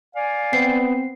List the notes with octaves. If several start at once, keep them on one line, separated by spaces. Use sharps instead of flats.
D5 F5 G#5
B3 C4 C7